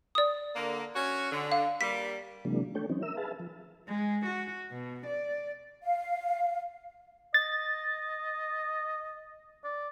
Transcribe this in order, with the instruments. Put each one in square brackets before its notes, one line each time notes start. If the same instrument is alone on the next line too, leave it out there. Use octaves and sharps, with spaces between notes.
[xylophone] D5 D#6
[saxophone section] D3 A#3
C#4 F#4 C#5
D3
[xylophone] F5
[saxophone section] G3 A#3 [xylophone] B6
[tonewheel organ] C3 E3 F#3 G#3 A#3 D4
A3 D4 A4 C#5 G5
E3 F#3 C4 C#4 D#4
A#4 E5 E6
G#4 B4 E5 F5 A5
F3
[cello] G#3
F#4
B2
D5
[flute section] F5
[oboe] D#5 [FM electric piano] A6
[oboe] D5